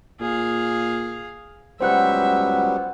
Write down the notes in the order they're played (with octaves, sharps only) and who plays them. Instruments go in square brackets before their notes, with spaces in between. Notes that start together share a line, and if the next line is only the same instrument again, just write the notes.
[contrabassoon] A#2 [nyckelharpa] G#4 F5
[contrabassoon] C#2 [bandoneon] F#3 G3 B3 [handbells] C5 F#5 F#6 [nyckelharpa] E5